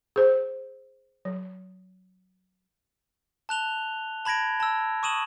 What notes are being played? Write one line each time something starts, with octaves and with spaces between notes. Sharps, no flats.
G#4 C5
F#3
A5 F#6 F7 G7
A5 B5 G#6 A#6 D7
A5 E6
C#6 D#6 D#7 E7 F#7